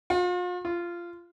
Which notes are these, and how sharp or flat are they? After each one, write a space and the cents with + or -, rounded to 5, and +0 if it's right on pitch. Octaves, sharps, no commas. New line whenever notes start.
F4 +40
F4 -15